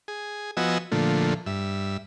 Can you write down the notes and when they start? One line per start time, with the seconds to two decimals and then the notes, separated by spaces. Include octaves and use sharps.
0.08 G#4
0.57 F3 B3 F#4 D#5 G#5 E6
0.92 A#2 D3 F3 A3
1.46 G2 E5